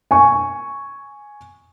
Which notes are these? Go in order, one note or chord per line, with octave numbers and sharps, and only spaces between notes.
G#5 C#6